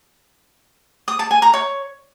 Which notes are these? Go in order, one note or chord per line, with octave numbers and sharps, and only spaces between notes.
D#6
A5
G#5
A#5
C#5